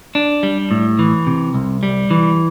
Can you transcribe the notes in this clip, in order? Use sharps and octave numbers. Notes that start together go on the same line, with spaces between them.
D4
G3
A2
E3
C3
C2
G3
E3